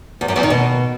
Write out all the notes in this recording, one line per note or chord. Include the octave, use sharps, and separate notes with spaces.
E2
F#2
E2
D#3
B2